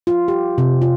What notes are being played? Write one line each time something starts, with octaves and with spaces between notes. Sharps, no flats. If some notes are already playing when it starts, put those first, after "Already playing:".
F4
G4
C3
F4